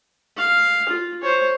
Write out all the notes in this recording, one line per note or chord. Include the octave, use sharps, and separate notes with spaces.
F5
F4
C5 C#5